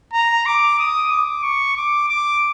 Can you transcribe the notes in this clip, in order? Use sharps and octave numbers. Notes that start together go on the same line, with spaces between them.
A#5
D6
D#6
D6
C#6
D6
D6